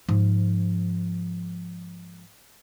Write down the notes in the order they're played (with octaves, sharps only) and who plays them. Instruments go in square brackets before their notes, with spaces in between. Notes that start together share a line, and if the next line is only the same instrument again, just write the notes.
[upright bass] G#2 F3